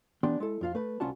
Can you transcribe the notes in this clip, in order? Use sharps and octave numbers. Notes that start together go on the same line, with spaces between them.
E3 B3 D4 G4 G5 C6
G#3 E4 A4
F2 F4 F5
A3 B4
C2 C#4 F4 F#4 A5